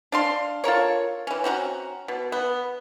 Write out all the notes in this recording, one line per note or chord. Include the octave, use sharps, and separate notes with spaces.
D4 F5 C6
F4 A4 A#4 C#5
E3 C#4
C4 C#4 F#4 A#5
B2
B3